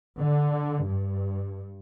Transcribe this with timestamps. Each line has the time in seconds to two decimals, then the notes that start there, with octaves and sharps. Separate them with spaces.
0.21 D3
0.88 G2